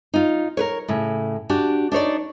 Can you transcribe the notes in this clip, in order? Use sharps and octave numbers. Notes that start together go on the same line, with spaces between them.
D#4 F4
A#4 B4 C#5
A2 C#3
D4 F#4 G4
D4 D#4 C#5 D5